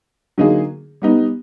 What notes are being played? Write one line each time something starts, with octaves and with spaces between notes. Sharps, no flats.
D3 F#3 A#3 D#4 G#4
G3 B3 D#4